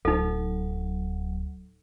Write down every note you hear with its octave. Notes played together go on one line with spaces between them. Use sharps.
D1 F#3 D#4 A4